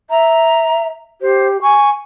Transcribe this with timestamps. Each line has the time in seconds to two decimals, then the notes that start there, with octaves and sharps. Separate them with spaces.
0.10 E5 A#5
1.21 G4 C5
1.62 G#5 C#6